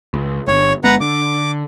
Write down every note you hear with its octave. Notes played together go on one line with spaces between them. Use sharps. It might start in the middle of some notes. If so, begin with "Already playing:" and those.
C#2
G1 C#5
G1 G#3 B3 B4 F#5 A#5
D3 D6